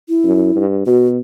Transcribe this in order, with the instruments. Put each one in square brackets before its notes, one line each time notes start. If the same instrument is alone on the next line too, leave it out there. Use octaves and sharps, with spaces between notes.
[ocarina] E4
[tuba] F#2
G2
[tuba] B2 [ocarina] F#4